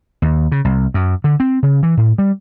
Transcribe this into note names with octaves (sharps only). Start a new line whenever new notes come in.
D#2
C#3
C2
F#2
D3
C4
C#3
E3
A2
G3